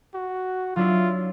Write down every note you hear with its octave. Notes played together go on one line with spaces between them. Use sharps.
F#4
F#3 D4 E4 F4